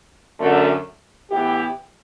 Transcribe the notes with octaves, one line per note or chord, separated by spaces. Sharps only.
F#2 D3 A3
A2 E3 B3 E4 G4